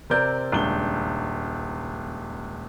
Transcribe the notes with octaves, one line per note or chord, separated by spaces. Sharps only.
C3 C4 A#4 D5 G6
D#1 C#2 D4 G7